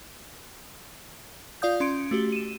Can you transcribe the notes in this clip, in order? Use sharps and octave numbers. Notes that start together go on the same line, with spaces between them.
F4 D5 F5 D#6 G6
C#4 C6 C#7 D7
A3 F#4 G4
D#7 E7